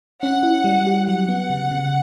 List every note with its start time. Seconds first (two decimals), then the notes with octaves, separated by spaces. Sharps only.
0.22 C#4 F#5
0.43 E4
0.64 G3
0.87 G4
1.07 F#3 F#5
1.29 B3
1.50 C#3
1.71 C#3